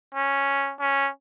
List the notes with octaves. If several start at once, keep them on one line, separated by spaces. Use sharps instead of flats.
C#4
C#4